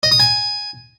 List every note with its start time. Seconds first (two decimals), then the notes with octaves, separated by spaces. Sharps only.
0.03 D#5
0.11 D#6
0.20 G#5